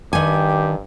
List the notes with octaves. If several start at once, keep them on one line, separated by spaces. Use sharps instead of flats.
G2 D#3 G4 G#5